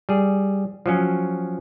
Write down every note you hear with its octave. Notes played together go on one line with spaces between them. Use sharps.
G3 G#4
F3 F#3 C#4